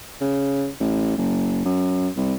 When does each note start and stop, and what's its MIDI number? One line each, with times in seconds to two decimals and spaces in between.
0.21 0.69 49
0.81 1.16 33
1.18 1.64 30
1.65 2.09 42
2.16 2.35 36